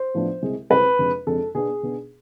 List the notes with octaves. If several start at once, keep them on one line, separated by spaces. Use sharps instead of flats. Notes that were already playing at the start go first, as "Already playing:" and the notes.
Already playing: C5
A2 F3 B3 D4
C2 C3 G#3 C4
C2 C3 G#3 C4 B4
F2 C3 G#3 D4
F2 C3 G#3 D4 A4
B2 B3 D4 G#4
B2 B3 D4